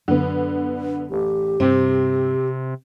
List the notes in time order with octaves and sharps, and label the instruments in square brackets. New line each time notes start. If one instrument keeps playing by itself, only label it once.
[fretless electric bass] F#2 [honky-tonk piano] D3 B3
[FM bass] A1 [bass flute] G4
[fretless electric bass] G2 [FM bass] C3 [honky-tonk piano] C4